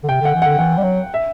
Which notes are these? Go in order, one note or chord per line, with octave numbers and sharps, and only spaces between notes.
D3
C3 G5
D3
F#5
E3
D3 F#5
E3 F#5
G3
F#3
E5